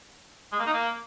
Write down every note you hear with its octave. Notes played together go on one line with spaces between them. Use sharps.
G#3
A#3
D#4
A#3